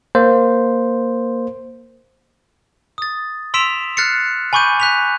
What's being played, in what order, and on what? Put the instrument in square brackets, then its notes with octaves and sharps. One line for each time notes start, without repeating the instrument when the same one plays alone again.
[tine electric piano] A#3 C5
[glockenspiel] D#6 A6
C6 E6 B6 D7 E7 F7
F6 F#6 A6 C7 C#7
G#5 B5 C#6 D6 G6 D#7
F#6 B6 F7